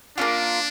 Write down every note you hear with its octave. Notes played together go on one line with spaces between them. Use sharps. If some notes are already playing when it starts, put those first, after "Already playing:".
A#3 C#4 D4 F4